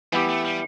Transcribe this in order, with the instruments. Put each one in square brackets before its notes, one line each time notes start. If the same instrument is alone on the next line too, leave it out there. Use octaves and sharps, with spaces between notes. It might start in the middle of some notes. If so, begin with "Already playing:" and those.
[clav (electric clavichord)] E3 B3 E4 G4 [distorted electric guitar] G3
[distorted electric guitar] A3
G3